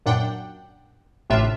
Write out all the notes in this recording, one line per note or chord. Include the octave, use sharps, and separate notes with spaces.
F#2 A#2 D4 F#5 G5
A1 A2 C3 D4 F4 E5